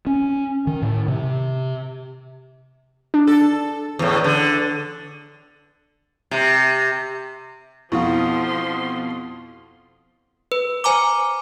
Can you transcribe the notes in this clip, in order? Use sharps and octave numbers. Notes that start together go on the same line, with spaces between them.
C#4
D#3
A2
C3
D4
A4
E2 A2
D3
C3
F2 B2 F3 E4 F4 C6 C#6
B4
C5 G#5 A#5 D6